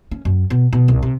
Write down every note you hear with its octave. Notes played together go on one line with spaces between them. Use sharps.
C#4
F#2
B2
B2
C2
C3